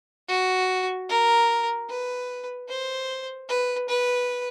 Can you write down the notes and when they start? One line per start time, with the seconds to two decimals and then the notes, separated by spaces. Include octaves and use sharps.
0.29 F#4
1.09 A#4
1.89 B4
2.69 C5
3.49 B4
3.89 B4